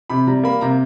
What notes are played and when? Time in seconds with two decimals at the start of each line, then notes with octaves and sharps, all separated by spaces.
0.10 C3 B5
0.27 G3 A#5
0.44 A#3 B5
0.61 C3 A#5